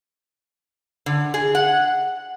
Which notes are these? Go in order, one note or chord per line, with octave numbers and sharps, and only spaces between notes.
D3
G#4
F#5